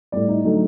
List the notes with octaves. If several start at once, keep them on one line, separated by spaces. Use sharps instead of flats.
A2 G3 D5
D#4
D3 F#3 A3 D#4